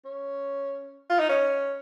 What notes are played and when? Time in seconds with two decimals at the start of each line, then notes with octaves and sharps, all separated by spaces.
0.05 C#4
1.10 F4
1.19 D#4
1.29 C#4